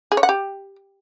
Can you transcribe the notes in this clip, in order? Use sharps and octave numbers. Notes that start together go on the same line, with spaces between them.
G#4
C#5
F#5
G4